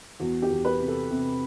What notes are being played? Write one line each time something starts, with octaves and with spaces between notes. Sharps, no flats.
E2 F#4
G4
E2
B4
C3
A4
C3